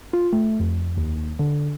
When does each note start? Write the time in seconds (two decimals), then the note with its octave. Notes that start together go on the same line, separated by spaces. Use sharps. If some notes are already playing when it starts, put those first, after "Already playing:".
0.13 F4
0.33 A3
0.60 F2
0.97 D#2
1.39 D3